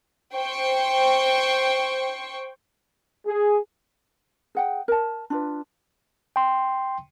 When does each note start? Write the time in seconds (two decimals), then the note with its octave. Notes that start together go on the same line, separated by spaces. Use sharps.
0.36 C5 G5 C#6
3.26 G#4
4.55 G#4 F#5 G5
4.88 A#4 A5
5.30 D4 F4 B4
6.36 G5 C6